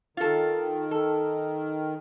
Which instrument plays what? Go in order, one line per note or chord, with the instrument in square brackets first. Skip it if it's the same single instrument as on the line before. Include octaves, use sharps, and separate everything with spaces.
[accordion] D#3 [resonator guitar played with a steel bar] F4 A4
[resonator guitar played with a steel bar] A4